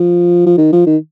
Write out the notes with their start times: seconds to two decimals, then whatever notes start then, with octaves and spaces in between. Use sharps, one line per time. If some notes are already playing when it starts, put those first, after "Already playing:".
Already playing: F3
0.46 F3
0.58 D#3
0.73 F3
0.86 D#3